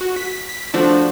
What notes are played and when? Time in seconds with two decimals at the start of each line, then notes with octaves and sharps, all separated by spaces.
0.01 F#4
0.16 B6
0.49 B6
0.74 F3 A3 D4 F#4